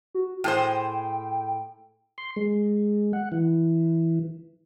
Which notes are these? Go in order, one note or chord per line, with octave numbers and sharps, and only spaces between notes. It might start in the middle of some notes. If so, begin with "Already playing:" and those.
F#4
A2 G#4 C5 G5
C6
G#3
F#5
E3